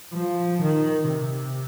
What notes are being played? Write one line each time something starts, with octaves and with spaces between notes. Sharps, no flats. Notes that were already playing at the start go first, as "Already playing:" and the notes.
F3
D#3
C3